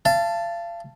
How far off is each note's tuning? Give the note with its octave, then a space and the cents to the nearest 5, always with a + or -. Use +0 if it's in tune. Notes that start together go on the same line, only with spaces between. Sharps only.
F5 -35 A5 +0